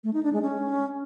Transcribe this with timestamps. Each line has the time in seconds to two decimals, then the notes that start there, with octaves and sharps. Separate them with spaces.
0.04 A3
0.13 D#4
0.23 D4
0.33 G#3
0.42 C#4